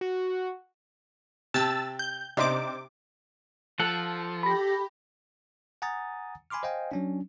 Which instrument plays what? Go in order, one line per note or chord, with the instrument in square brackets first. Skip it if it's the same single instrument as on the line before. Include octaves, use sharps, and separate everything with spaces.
[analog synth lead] F#4
[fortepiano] C3 [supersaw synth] A5 E6 A6
[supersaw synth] G6
[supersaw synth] C3 D6 [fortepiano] D4 D#4 C5
[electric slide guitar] F3 [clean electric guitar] A4 F#5
[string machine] G4 [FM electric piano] B5 A#6
[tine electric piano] F#5 G#5 A#5 D#6 A6
G#5 B5 C6 D6 F6
C5 D#5 F5 G5 G#5
F#3 C#4 D4